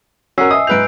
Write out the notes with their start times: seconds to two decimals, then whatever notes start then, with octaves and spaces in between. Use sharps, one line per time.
0.38 C#4 F#4 A#4 F#5 G#5 E6 C7
0.51 D#5 E5 D#6
0.67 G#2 B4 G6 D7 F7